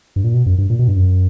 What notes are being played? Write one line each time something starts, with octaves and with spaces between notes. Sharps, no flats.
G2
A#2
B2
F#2
G2
A#2
B2
G2
F#2